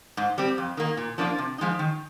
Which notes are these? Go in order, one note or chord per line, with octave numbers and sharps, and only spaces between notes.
G#2
G3 C4
F2
D#3 A#3
A#2
F3 A#3 D4 F4
C3
F3 G#3 D#4
D#3